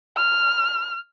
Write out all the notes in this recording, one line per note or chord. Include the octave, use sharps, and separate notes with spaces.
F6